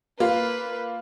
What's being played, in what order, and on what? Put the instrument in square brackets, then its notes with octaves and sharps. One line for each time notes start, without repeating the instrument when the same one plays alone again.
[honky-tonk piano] A#3 F4 [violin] B4